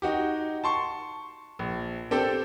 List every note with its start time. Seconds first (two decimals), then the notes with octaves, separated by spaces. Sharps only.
0.02 D#4 F#4 G4
0.64 A5 C6 C#6
1.59 A#1
2.11 C4 D4 G4 A4